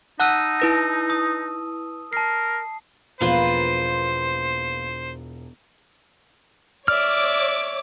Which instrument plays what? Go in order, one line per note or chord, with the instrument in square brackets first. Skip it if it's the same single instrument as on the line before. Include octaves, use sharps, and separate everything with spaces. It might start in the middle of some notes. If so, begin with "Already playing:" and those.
[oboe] D#4 [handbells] F#5 F#6 [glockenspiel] A5 E6 D#7
[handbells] E4 B4 A#6
[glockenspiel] D#6
[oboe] A#4 [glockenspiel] A5 C7
[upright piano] E1 F3 G7 [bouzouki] A#3 F4 B4 [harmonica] C5
[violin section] C#5 D6 [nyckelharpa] D5 E5 [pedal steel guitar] F6